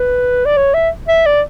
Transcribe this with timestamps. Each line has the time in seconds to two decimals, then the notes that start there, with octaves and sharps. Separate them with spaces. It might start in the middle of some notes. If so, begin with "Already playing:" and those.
Already playing: B4
0.46 D5
0.57 C#5
0.74 E5
1.08 E5
1.26 D5